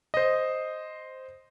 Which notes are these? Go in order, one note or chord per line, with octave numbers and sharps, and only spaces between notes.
C5 D#5